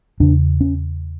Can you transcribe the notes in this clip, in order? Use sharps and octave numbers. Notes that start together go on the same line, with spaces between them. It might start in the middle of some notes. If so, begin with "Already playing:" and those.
E2 C#3 D4
C#4